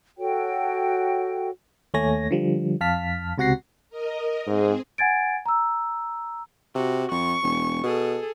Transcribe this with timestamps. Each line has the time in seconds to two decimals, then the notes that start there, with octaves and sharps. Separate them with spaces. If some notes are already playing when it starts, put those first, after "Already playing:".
0.18 F#4 A4 C#5 G5
1.94 D#2 A3 C#5 G#5 A#6
2.31 D3 F3 G3
2.81 F2 F5 A5 F6 B6
3.38 C#2 C3 F#4 F#5 A#6 C7
3.89 A#4 D#5
4.47 G#2 C4 G#4
4.98 F#5 G#5 G#6 A6 D7
5.46 A#5 E6
6.75 C3 F#4
7.11 F2 C#6
7.42 E1
7.83 B2 G#4 A4